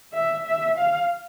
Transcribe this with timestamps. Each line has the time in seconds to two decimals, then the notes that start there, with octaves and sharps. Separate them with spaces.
0.13 E5
0.46 E5
0.77 F5